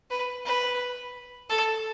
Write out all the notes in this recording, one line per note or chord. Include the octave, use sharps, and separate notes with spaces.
B4
B4
A4